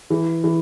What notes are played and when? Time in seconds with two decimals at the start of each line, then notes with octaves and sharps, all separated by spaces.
0.10 E3
0.44 E3